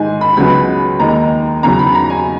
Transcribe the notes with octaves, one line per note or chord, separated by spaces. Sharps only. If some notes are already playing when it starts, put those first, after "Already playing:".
Already playing: G#2 D#3 G#3 G#5
B5
C#2 C#3 F#3 B3 B5
D#2 D#3 G#3 A#5
E2 C#3 F#3 A#5
B5
A#5
G#5